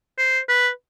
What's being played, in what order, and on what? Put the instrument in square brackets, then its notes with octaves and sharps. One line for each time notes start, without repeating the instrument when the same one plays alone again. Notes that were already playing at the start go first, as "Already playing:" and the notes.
[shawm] C5
B4